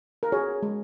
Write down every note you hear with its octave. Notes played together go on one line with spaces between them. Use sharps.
A#4
F#4 G#4 C#5
G#3